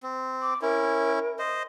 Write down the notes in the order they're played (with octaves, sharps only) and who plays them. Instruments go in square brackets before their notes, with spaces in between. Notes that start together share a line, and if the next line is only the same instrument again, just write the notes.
[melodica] C4
[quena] D6
[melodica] C#4 E4 [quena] A#4
[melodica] C5 D#5